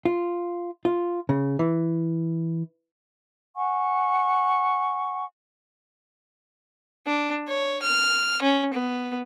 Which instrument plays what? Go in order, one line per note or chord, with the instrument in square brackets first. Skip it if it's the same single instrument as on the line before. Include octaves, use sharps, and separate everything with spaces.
[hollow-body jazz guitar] F4
F4
C#3
E3
[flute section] F#5 G#5 C#6
[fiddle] D4
C#5
F6
C#4
B3